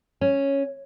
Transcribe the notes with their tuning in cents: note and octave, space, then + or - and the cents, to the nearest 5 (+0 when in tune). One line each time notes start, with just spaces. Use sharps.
C#4 -5